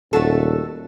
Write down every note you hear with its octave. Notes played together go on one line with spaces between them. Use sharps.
D#1 A3 F#4 A4